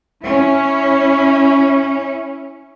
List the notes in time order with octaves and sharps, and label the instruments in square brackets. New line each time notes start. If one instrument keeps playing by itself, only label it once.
[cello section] C#4 E4